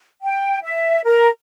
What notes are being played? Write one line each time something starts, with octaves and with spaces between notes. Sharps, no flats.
G5
E5
A#4